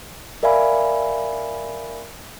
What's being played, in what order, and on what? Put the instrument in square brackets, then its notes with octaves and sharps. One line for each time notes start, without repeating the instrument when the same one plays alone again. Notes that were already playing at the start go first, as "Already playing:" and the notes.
[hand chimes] A#4 D5 E5 F5 G#5 B5